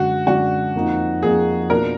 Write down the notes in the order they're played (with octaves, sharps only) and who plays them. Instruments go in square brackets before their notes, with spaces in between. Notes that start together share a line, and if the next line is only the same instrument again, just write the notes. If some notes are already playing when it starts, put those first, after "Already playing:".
Already playing: [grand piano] F#2 D3 G#3 D4 [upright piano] F#4
[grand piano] F#2 D3 G#3 D4 [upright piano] F#4
[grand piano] F2 F3 A#3 D#4
[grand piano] F2 F3 A#3 D#4 [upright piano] G#4
[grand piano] B2 A#3 D4 F4 [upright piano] A#4